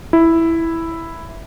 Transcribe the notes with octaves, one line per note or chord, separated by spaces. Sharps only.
E4